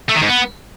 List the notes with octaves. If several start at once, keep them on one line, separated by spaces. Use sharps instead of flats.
A3
D#3
G#2
B3